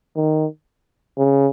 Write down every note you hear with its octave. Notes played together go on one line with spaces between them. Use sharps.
D#3
C#3